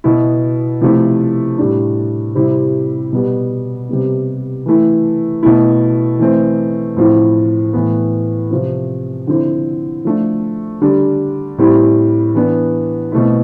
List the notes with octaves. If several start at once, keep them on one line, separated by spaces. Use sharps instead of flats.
B2 B3 E4
C3 F3 A3 E4
A2 G3 D4
C3 G3 C4 E4
B2 G3 B3
C3 G3 B3
E3 A3 E4
B2 A3 E4
E3 A3 C4
A2 F3 C4 E4
A2 E3 B3
C3 F3 C4
D3 F3 C4 E4
F3 A3 D4
D3 G3 D4
A2 G3 C4 E4
E3 B3 D4
B2 A3 C4 E4